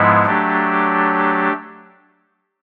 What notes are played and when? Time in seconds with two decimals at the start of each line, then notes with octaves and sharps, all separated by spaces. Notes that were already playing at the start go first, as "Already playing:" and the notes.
Already playing: G#2 F3 G#3 B3 E4
0.26 F#3 A3 D4 G4